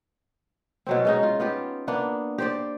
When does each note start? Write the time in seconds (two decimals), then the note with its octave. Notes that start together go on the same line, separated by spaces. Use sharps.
0.87 B2 F#3 C4
1.05 G#3 C#4 D#4
1.23 F4
1.40 B3 F4 G4
1.88 A#3 B3 D4
2.38 G4 C5 D5